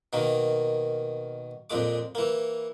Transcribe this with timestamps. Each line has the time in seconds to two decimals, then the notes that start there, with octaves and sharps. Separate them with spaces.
0.13 B2 D#3 A#3
1.70 F2 A#2 G#3 D6
2.15 E3 A#3